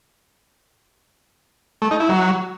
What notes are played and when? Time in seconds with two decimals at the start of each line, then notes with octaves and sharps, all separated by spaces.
1.82 A3
1.91 D#4
2.00 E4
2.09 F#3